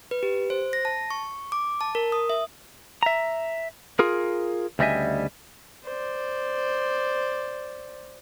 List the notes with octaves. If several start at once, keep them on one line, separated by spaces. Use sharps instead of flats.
B4
G4
C5
A#6
A5
C#6
D6
A5
A#4
D#6
E5
E5 A#5
F4 G#4 A#4
D2 C#3 G3 D#5 E5 G#5
C5 D5